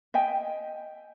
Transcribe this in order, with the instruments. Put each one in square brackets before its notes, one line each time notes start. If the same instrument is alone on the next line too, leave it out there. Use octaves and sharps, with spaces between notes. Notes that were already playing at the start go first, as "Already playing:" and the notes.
[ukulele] D#5 E5 G5 G#5